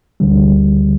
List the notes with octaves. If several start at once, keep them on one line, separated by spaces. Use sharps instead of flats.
D2 D3 G3